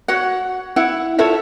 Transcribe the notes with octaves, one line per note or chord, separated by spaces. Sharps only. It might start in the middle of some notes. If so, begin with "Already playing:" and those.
F#4 C#5 F#5
E4 F#5
F4 A4 C#5 E5